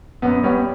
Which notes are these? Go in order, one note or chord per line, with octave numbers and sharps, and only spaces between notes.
F#2 B3
G3 B3 C#4